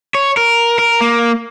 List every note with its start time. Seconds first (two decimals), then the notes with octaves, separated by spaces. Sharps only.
0.15 C#5
0.37 A#4
0.79 A#4
1.00 A#3